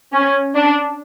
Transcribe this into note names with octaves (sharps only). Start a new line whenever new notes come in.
C#4
D4